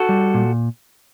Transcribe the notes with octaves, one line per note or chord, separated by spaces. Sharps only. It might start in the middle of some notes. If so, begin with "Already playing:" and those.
Already playing: F#4 A4
G3
A#2